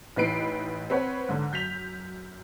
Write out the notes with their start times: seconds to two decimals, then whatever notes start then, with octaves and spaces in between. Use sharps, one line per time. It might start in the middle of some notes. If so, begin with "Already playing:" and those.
0.16 A1 E3 D#4 B4 C7 D7
0.90 C4 B4 C#5 F#5
1.29 G#2 D3
1.52 F#2 G6 B6 F7